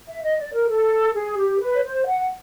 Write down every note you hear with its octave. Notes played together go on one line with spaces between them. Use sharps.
E5
D#5
D5
A#4
A4
G#4
G4
B4
C#5
C5
F#5